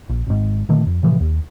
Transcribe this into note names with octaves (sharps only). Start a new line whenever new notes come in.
A#1
G#1 G#2
A#2 D3 D#3 A3
F2
A2 C3 E3 F3
D#2